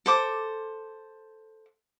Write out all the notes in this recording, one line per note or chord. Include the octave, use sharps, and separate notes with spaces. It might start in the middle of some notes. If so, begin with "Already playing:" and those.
A4 C5 D6